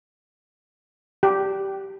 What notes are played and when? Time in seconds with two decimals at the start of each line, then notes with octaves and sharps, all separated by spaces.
1.23 G4